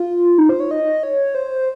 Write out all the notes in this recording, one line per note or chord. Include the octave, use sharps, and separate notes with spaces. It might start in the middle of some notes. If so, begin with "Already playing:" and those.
Already playing: F4
D#4
C5
C#5
D#5
C#5
C5